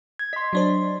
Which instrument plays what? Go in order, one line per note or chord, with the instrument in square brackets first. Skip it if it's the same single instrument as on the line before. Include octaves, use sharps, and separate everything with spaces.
[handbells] G#6
[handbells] D#5 C6 [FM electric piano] B6
[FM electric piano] F#3 D4 C5